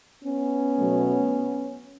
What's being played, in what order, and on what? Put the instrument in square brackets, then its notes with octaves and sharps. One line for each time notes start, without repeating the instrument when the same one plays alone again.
[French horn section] B3 C#4
B2 F#3 A3